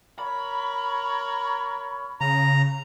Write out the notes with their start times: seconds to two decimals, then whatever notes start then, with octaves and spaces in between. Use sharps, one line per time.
0.19 A#4 C#5 B5
2.21 C#3 A#5